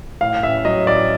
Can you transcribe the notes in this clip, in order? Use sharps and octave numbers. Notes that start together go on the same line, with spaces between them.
A2 F5
A1 E5
F#3 D#5
A1 D5